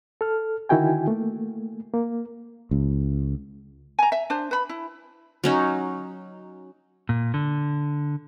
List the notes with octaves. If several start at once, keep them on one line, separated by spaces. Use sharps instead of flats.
A4 F6
D3 D#3 E4 F#4 G5 G#5
A3 A#3
A#3
C#2
G#5 A#5
E5
D4 C5
B4 B5
E4
F#3 C#4 D#4
A#2
D3